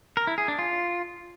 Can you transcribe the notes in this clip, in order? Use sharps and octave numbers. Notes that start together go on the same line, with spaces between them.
A#4
E4
G#4
D4
F4